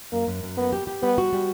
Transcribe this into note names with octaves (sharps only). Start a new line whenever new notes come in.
F#2 A#3
F#2
F#2
A#3 B3
G4
G4
G3 B3
F#4
G3